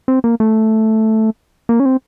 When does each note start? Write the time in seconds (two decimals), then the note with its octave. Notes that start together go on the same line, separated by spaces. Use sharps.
0.08 C4
0.24 A#3
0.40 A3
1.69 A#3
1.80 C#4
1.85 C4